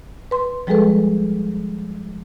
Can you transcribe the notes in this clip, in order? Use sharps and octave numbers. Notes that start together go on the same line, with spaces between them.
B4 C6
F3 G3 G#3 G#4 A4 B4